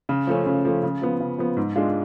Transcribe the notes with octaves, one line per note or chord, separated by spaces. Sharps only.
C#3
F3 A3 C#4
C#3
F3 A3 C#4
C#3
F3 B3
C#3
F3 B3
G#2
G#3 D4 F4